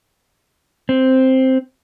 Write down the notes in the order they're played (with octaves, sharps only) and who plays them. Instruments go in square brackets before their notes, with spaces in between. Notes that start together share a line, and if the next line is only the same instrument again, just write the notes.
[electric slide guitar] C4